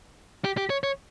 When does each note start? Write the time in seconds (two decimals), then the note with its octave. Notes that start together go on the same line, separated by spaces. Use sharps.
0.45 G4
0.57 G4
0.70 C#5
0.83 C#5